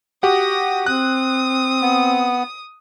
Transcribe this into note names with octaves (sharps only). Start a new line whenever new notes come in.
F#4 G4 F#5 D#6 A#6
C4 D#6 F#6
B3